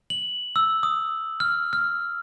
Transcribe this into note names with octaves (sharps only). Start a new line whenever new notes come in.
F#7
E6
D#6
F6
F6